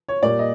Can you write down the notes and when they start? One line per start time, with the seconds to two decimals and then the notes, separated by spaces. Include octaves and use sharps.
0.08 C#5
0.23 A#2 G3 A#3 D5
0.39 D#5